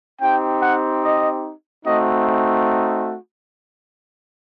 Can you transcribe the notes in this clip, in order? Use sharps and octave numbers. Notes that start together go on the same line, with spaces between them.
C4 D#4 G4 G5
F#5
D#5
A3 C4 D#4 F#4 D#5